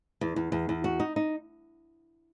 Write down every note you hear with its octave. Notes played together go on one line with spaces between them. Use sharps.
E2
E2
E2
E2
F#4
D#4
D#4